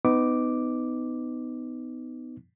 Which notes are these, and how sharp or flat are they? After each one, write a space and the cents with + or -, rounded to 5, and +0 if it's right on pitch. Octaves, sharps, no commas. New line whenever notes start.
B3 +25 D#4 +0 D6 +0